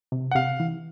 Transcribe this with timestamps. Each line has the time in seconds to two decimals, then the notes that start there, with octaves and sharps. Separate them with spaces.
0.12 C3
0.31 F#5
0.35 C3 F5
0.60 E3